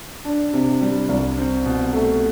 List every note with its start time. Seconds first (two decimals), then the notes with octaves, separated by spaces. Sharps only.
0.25 D4
0.53 C3
0.81 G3
1.09 C2
1.38 C4
1.65 B2
1.94 A3